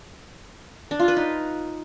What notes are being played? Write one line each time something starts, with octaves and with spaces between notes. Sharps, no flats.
D4
F4
B4
D#4